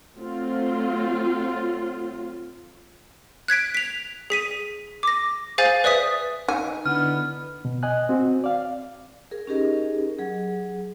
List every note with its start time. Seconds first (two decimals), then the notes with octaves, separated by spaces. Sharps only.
0.17 F#3 A3 C4 F4
3.48 F#6 G#6 B6 D7
3.75 B6 F7
4.30 G#4 B6 D#7
5.03 D6 A#6
5.58 G#4 C5 F5 G#5 G6 A6
5.84 B4 D5 E5 D#6 B6
6.48 D#4 G#5
6.85 D3 B3 D4 E4 F6
7.65 B2
7.83 D#5 G#5 F#6
8.09 C4 F#4
8.44 D5 F5
9.31 G#4 A#4
9.47 C#4 D#4 G4 G#4 A#4 D#5
10.19 F#3 G#4